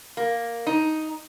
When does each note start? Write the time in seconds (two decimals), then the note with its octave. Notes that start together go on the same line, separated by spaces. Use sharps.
0.17 A#3
0.67 D#4